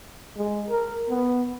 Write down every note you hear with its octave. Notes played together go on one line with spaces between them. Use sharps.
G#3
A#4
B3